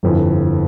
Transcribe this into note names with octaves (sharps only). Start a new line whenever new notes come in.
G1 F2 E3